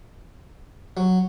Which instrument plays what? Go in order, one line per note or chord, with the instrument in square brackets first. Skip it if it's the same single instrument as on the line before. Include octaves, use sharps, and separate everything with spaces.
[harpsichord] F#3